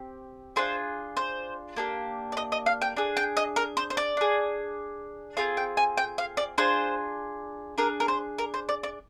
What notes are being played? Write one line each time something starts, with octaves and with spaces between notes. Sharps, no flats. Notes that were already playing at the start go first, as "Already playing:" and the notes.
Already playing: C4 G4
D4 F4 G#4 C5
C5
A#3 D4 G4
D5
D#5
D#5
F5
G5
D4 G#4
G5
D#5
A#4
C5
C5
D5
D4 G#4
C4 F4 G#4 F5
G5
G#5
G5
F5
D5
D4 F4 G#4 C5
D4 G#4 A#4
A#4
C5
A#4
C5
D5
D5